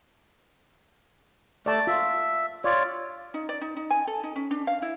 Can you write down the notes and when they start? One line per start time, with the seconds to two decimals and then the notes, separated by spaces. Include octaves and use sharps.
1.66 A3 D5 A5
1.87 F4 E5
2.64 F4 C#5 D5
3.34 D#4
3.49 D5
3.61 D#4
3.77 D#4
3.91 G#5
4.07 A4
4.23 D#4
4.36 C#4
4.51 D4
4.67 F5
4.82 E4